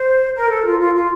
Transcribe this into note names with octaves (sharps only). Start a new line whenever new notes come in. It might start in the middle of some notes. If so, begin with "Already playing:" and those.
Already playing: C5
A#4
A4
F4
F4
F4